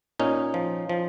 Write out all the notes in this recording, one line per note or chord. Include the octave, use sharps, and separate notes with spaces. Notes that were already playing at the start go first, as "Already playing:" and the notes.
A#2 C#4 D#4
F3
F3